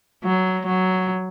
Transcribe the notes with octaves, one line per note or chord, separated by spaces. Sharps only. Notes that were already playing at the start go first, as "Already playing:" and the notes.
F#3
F#3